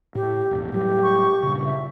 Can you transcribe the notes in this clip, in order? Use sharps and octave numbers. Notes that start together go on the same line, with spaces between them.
A2 G4
E1 A1
A2 F#3 G3 G4
C#6
G2 A#2 C#3
E5